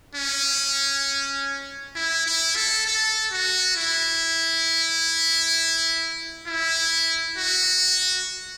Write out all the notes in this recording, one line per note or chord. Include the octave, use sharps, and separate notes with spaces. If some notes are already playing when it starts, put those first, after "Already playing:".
C#4
E4
E4
A4
A4
F#4
E4
E4
F#4